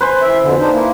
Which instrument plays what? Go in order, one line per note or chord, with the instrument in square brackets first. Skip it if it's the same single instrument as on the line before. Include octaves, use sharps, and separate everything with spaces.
[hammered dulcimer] B4 C5 G#5
[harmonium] E3 E5
F2 B2 D3
D4 D#4 C5
A#3 E4